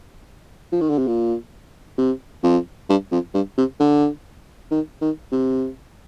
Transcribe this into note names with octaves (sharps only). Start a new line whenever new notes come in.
F3
D#3
D3
C3
A#2
C3
F2
G2
F2
G2
C3
D3
D#3
D#3
C3